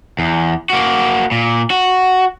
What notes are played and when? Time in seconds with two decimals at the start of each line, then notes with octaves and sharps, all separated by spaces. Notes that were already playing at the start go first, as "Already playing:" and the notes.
0.19 E2
0.70 A#3 F#4
1.32 A#2
1.70 F#4